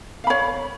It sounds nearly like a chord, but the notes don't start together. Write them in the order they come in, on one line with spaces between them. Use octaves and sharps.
F5 B5 C#5